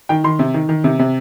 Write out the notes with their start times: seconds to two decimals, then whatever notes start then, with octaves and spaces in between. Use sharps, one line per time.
0.09 D#3 G5
0.24 D#3 C6
0.39 C3
0.54 D#3
0.69 D#3
0.84 C3
0.99 C3